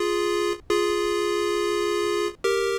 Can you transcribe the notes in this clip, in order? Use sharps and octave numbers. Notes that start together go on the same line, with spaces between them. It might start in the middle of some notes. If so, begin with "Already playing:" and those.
Already playing: F4 G#4
F4 G#4
G4 A#4